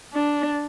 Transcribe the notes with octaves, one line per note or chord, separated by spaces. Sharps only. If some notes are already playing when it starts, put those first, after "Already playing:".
D4